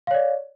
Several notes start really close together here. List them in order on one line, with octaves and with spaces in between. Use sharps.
F5 C#5 D5